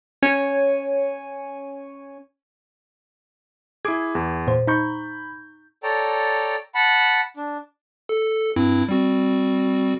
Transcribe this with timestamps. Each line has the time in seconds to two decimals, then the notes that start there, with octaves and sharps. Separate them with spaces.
0.22 C#4 C#5 G#5
3.85 E4 G#4 D6 G#6
4.15 E2
4.47 A#2 C5
4.67 D#4 A#5 B5 C#6 G6
5.83 A4 C#5 D5 G5 A5 A#5
6.75 F#5 A5 B5
7.37 D4
8.09 A4
8.56 G2 C4 E4
8.89 G3 C4 F#4